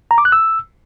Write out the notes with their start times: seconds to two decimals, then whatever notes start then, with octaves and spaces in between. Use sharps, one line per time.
0.11 A#5
0.18 D6
0.25 F#6
0.32 E6